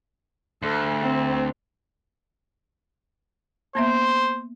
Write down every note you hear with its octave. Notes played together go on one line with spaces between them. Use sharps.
D2 A4
C4
A#3 B3 C5 E5